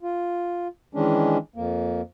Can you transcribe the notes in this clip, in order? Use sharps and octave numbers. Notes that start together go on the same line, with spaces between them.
F4
D#3 E3 G#3 C#4 D4
F2 A#3